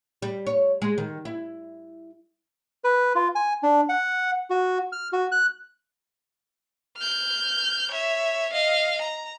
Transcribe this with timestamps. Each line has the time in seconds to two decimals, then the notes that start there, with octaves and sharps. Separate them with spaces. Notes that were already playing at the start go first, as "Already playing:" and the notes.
0.22 G3
0.47 C#5
0.82 G#3
0.98 D#3
1.25 E4
2.84 B4
3.15 F4
3.35 G#5
3.63 D4
3.89 F#5
4.50 F#4
4.92 F6
5.13 F#4
5.32 F#6
6.97 F6 G6
7.91 C#5 E5
8.53 D#5 F5
9.01 A#5